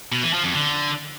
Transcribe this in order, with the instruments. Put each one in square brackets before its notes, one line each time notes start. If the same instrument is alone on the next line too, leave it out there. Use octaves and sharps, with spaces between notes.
[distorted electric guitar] B2
E3
F3
F2
D3